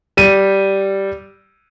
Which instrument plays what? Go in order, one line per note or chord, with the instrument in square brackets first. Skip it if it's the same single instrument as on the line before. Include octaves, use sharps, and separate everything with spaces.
[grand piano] G3 D#7